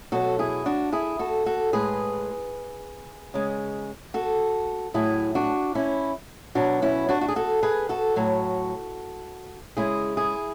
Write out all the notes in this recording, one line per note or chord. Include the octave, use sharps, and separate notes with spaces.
B2 F#3 F#4 A4
E4 G#4
D4 F#4
E4 G#4
F#4 A4
F#4 A4
A2 G#3 G#4 B4
C#3 G#3
F#4 A4
A2 F#3 E4 G#4
D4 F#4
C#4 E4
B2 F#3 D4 F#4
C#4 E4
D4 F#4
F#4
G#4
F#4 A4
G#4 B4
F#4 A4
A2 F#3
C#3 G#3 E4 G#4
E4 G#4